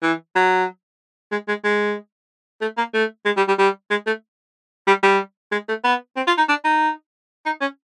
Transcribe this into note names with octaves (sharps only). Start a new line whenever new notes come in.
E3
F#3
G#3
G#3
G#3
A3
A#3
A3
G#3
G3
G3
G3
G#3
A3
G3
G3
G#3
A3
B3
C4
F4
D#4
D4
D#4
D#4
C#4